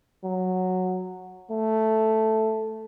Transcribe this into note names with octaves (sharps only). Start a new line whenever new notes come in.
F#3
A3